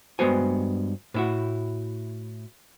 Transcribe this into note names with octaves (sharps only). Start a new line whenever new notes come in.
G2 G#3 B3 F#4 C5 G#5
A2 E4 F#4